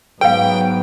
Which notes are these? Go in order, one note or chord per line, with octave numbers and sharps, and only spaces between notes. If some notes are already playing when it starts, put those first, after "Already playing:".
G#2 F#3 B3 B4 F5 G5